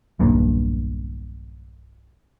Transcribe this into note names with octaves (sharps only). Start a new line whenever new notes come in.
D#1 B1 G2 A#3